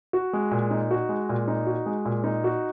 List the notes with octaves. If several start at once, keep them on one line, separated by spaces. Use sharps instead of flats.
F#4
G#3
A#2
D#4
F#4
G#3
A#2
D#4
F#4
G#3
A#2
D#4
F#4